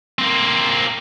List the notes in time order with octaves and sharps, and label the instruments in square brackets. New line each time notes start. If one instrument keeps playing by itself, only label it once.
[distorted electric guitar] A#3 C4